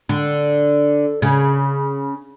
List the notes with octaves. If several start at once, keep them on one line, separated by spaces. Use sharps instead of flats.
D3
C#3